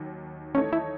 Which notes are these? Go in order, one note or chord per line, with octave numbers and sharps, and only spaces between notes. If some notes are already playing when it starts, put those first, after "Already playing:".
Already playing: D#2 D#3 F#3
E3 A3 C#4 D#4 A4 C#5
E4